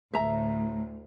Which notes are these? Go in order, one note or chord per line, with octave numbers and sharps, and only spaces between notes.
D2 A2 E5 A#5